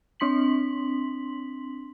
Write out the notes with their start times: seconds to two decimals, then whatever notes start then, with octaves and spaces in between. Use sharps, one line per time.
0.20 C4 D4 C6 B6 F#7